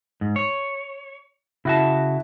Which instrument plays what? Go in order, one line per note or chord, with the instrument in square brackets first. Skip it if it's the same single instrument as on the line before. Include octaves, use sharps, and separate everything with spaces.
[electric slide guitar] G#2
C#5
[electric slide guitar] C#3 F#4 A5 [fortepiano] E4